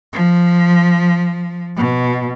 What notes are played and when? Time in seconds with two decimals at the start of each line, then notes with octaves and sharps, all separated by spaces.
0.13 F3
1.76 B2